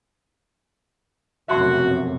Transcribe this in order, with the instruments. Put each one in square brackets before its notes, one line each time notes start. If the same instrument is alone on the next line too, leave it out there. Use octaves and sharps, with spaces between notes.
[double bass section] F1 B1 F#2 [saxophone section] F#4 [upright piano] E5 A5 C6